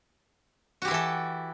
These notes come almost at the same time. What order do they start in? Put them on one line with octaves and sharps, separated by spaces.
F#4 G4 E4 E3 A4